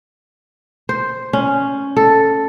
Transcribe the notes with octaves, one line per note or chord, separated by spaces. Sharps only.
C5
C#4
A4